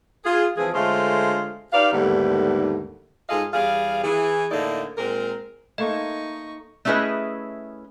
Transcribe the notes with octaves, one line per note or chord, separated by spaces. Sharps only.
F4 G#4
E3 F3 C4 G#4
D3 G#3 A3 F4 C5 C#5
D#4 G4 B4 D5 F5
D#2 G#2 D3 G3 A3 B3
G#2 F4 G#4 A4 D#5 F5
E2 G3 G#4 F5
E3 G#4
A2 D3 A#3 D#4 E4 D5
A#2 G#3 C4 A#4
A3 A#3 D#4 C5 D#5 C#6
A3 C#4 E4 G#4 B4 D#5